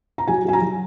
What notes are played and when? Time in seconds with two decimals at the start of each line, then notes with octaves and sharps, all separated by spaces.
0.18 A#5
0.27 F#3 G#5
0.45 F#3 G#5
0.53 A#5
0.62 F#3